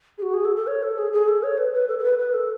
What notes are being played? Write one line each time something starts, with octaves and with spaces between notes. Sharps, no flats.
G#4
F#4
G#4
A4
A4
C#5
A4
G#4
G#4
A4
C#5
B4
B4
A4
A4
B4
B4
A4